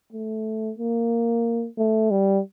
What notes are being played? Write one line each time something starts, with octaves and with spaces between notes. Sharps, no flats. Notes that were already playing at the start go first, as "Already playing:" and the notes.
A3
A#3
A3
G3